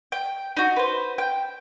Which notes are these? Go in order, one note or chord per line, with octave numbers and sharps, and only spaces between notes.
G5
D#4 F#4
B4 C5
G5